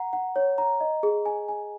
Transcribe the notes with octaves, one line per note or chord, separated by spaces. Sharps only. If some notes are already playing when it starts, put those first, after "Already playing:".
Already playing: F#5 A#5
F#5
C#5
A#5
D#5
G#4
G#5
G#5